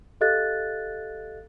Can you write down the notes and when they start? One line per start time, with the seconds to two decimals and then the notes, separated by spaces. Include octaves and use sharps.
0.21 G4 A4 D#5 F5 F#6 A6